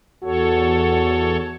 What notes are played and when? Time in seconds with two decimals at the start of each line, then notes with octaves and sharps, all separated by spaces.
0.24 E2 F#4 A4 C#5